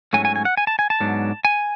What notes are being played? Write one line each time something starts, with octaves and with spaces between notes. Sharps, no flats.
G#2 F#3 A3 C#4 G#5
G#5
G#5
F#5
G#5
A5
G#5
A5
G#2 F#3 B3 D4
G#5